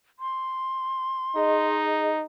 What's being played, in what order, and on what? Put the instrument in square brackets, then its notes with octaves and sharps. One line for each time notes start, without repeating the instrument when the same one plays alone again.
[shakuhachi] C6
[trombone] D#4 [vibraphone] G#4 D#5